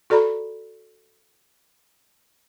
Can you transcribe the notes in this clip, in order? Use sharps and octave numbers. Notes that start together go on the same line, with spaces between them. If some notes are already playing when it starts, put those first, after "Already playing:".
F#4 A4 D5 A#5 B5